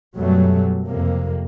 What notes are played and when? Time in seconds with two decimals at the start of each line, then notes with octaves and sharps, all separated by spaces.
0.15 F#2 B2 F#3 G3 A3
0.86 F2 C3 A#3